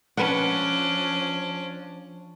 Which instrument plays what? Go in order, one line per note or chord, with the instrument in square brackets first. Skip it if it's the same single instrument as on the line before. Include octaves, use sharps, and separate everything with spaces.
[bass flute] F3 [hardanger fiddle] C#4 D4 [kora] B4 F#5